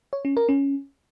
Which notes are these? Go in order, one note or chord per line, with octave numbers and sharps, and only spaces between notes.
C#5
C#4
A#4
C#4